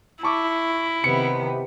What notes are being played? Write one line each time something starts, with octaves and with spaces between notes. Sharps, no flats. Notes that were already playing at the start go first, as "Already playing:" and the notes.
E4 A5 C#6 D6
C3 D#3 B3 C#7